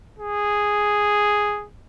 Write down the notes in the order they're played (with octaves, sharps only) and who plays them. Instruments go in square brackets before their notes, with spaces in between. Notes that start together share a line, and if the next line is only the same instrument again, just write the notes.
[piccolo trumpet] G#4